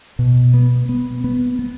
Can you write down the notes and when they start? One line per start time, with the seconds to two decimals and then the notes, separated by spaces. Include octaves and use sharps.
0.19 B2
0.54 B3
0.89 B3
1.24 B3
1.59 B3